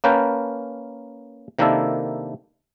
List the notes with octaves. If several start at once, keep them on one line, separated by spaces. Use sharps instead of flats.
A#3 C#4 A#4 B4 G5 A5
C3 D#3 A#3 D4 E4 A4